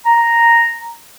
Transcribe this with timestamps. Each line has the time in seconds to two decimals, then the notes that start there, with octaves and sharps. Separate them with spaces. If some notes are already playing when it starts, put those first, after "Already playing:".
0.06 A#5